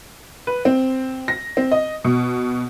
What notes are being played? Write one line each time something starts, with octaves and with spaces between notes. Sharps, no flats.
B4
C4
A#6
C4
D#5
B2